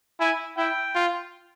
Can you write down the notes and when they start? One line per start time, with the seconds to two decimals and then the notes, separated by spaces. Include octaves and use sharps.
0.20 E4 G#5
0.57 E4 G5
0.95 F4